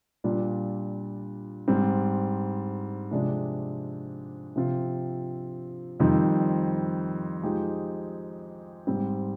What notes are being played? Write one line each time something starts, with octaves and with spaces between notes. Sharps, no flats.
A#2 G3 D4 F4
G#2 G3 C4
C3 F3 G#3 D4
C3 F3 C4 F4
F2 D#3 G3 C4 D#4
F3 G#3 D#4 G4
G#2 G3 C4